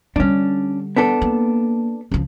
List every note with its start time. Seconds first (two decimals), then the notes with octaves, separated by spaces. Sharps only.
0.16 D3 G3 C#4 D4
0.97 B3 D4 A4
1.22 A#3
2.11 C#2 F3